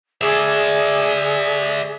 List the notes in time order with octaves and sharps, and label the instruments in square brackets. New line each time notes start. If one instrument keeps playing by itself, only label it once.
[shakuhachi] G#4 [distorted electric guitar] D5 E5